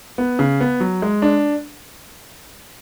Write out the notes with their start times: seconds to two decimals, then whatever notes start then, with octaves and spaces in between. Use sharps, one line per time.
0.18 B3
0.39 C#3
0.60 B3
0.80 F#3
1.02 G#3
1.22 D4